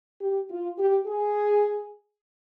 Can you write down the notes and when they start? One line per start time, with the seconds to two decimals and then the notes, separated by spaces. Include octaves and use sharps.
0.21 G4
0.50 F4
0.79 G4
1.07 G#4